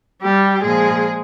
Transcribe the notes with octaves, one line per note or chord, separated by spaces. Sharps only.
G3 G4
A#2 F3 G#3 G#4